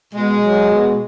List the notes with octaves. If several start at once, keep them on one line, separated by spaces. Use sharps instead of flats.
B2 G#3
F#3
B2